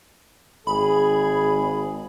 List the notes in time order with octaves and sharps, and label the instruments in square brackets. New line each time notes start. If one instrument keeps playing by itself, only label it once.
[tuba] G#1 [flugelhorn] G#4 [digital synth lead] B5